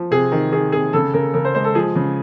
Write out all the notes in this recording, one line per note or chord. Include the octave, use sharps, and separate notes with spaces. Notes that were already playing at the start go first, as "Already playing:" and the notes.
Already playing: F3
C3 G#4
D#3
D#3 G#4
C3 G#4
C#3 A4
C#3 A#4
C#3 A#4
C5
G#3 C5
A4
F3 G#4
C#3